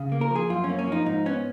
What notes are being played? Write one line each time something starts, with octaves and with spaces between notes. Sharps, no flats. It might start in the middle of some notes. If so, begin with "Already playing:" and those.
Already playing: C#3
A#3
A#4
F3 G#4
F#2 F4
C#4
A#3
C#4
F3 D#4
G#2 D#4
B3 C#4